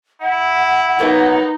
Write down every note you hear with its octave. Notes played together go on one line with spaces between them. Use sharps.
E4 F#5
F#3 A#3 B3 D#4